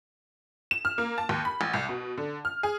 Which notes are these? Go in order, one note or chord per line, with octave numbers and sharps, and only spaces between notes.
E7
F6
A#3
A5
D#2
B5
A1
C2
B2
D3
F6
G#4